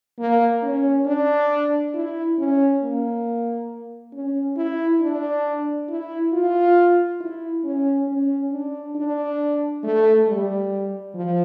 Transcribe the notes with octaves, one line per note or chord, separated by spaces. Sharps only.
A#3
C#4
D4
E4
C#4
A#3
C#4
E4
D4
E4
F4
E4
C#4
C#4
D4
D4
A3
G3
F3